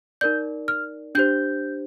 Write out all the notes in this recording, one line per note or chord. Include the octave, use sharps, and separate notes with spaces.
D#4 A#4 D5 G6
F6
D4 G4 C5 G6